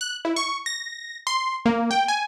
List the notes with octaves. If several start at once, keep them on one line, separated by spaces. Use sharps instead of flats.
F#6
E4
C#6
A#6
C6
A#3
G5
G#5